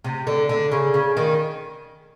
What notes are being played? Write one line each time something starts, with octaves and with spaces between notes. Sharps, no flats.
C3
D3
D3
C#3
C#3
D#3